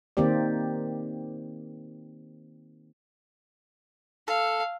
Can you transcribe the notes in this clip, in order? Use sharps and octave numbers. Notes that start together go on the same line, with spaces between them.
D#3 A#3 C4 G4 D5
A4 F5